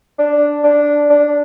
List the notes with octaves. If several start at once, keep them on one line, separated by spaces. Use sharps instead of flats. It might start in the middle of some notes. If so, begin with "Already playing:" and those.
D4
D4
D4